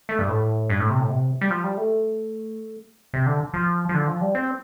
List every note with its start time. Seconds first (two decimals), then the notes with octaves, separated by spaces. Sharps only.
0.09 A3
0.19 G2
0.29 A2
0.70 G2
0.80 A2
0.90 C3
1.00 A2
1.10 C3
1.41 G3
1.50 F3
1.64 G3
1.77 A3
3.14 C3
3.26 D3
3.54 F3
3.89 F3
3.94 D3
4.07 F3
4.21 G3
4.35 C4